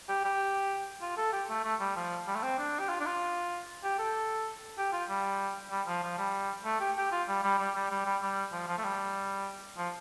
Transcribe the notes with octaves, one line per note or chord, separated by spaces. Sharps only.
G4
G4
F4
A4
G4
A3
A3
G3
F3
G3
A3
C4
D4
G4
F4
D4
F4
G4
A4
G4
F4
G3
G3
F3
F3
G3
A3
G4
G4
F4
G3
G3
G3
G3
G3
G3
G3
F3
F3
A3
G3
F3